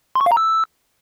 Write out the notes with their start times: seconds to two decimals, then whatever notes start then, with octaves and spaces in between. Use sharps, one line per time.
0.15 C6
0.21 C#6
0.26 F5
0.32 A#5
0.37 E6